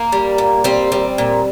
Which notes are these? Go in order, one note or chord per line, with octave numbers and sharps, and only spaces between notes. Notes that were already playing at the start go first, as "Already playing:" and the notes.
Already playing: A#3
G3
A#2
G3 C4
G3
A#2